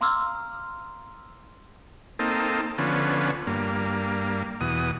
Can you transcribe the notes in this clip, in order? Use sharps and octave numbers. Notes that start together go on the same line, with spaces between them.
F5 A#5 C6 D6 E6 F6
A#3 C4 D#4 A4
D3 F3 B3 C#4
G2 A#3
E2 B2 D#6